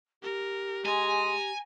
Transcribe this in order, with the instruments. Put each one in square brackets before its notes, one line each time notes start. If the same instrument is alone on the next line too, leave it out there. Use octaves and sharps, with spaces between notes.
[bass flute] G4 [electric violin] A#4
[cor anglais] G#3 [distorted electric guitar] G#5 [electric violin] A#5